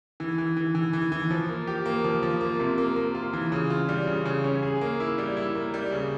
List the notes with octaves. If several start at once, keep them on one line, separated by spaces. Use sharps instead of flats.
E3
E3
E3
E3
E3
E3
F3
A#3
G4
A#3
F3
F3
A#3
C3
A#3
A#3
F4
E3
C#3
F4
G3
C#3
C#3
C#4
G#4
A#3
E4
G3
E4
A#3
G3
C#3